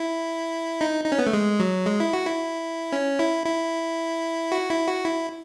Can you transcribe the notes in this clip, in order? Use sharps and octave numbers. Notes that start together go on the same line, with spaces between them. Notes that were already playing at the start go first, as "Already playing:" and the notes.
Already playing: E4
D#4
D#4
C#4
B3
A3
G#3
F#3
G#3
E4
F#4
E4
C#4
E4
E4
F#4
E4
F#4
E4